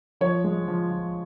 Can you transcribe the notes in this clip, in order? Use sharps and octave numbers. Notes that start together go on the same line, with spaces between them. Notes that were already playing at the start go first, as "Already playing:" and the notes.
F3 C#5
G#3
F3
F3